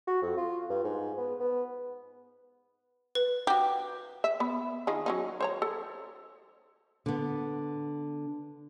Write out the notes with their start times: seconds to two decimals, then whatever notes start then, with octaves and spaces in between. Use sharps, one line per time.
0.07 F#4
0.22 F2
0.37 F4
0.70 G2
0.84 G#2
1.18 B3
1.40 B3
3.15 B4
3.47 F#4 G4
4.24 E5
4.40 B3
4.87 D#3 F4 G#4
5.06 F#3 C#4 D#4
5.41 C5 C#5 A#5
5.62 A4
7.06 D3 B3